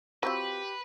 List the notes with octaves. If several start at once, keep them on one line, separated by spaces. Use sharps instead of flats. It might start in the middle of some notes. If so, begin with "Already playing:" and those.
F#3 C4 F4 G4 B4